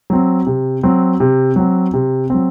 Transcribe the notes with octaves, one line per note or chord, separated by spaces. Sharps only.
F#3 C4
C3
F#3 C4
C3
F#3 C4
C3
F#3 C4